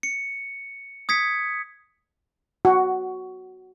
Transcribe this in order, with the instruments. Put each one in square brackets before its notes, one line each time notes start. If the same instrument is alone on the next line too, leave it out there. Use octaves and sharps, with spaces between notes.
[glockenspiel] C#7
D#6 G#6 B6 C#7
[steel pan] F#4